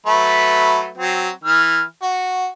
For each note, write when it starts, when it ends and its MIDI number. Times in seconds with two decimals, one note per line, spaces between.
0.06 0.89 54
0.06 0.89 57
0.06 0.89 71
0.98 1.29 54
0.98 1.29 60
1.44 1.82 52
1.44 1.82 89
2.02 2.47 66